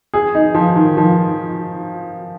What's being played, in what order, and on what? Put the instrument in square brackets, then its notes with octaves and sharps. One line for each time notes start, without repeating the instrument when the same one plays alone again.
[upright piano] G#4
D#4
F3
D#3
F3